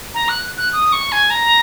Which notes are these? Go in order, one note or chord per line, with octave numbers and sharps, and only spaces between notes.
A#5
F#6
F#6
D#6
C#6
G#5
A#5